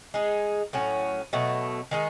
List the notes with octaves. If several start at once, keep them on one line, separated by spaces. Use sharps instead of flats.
G#3 D#4 G#4
A2 F#3 C#4
B2 F#3 A3
D#3 G#3 D#4